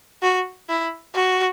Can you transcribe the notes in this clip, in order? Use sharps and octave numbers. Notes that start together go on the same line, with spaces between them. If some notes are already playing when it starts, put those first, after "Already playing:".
F#4
E4
F#4